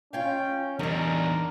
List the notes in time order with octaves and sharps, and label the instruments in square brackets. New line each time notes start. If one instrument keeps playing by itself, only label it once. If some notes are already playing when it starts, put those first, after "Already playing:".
[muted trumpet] C#4 [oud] F4 C#5 F5 [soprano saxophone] G5
[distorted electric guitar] E2 G3 [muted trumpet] D4 [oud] D#4 C#5 [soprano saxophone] A#4